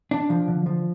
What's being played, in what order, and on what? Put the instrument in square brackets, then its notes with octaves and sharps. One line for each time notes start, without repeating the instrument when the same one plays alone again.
[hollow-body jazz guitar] D4
F3
D3
F3